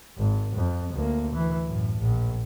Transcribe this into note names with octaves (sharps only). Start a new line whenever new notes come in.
G#1
F2
D2 A#3
E3
F#2 A2
A#1